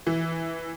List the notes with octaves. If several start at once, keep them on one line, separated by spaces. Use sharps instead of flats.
E3